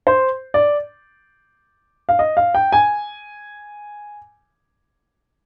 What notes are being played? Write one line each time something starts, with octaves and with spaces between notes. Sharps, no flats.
C5
D5
F5
D#5
F5
G5
G#5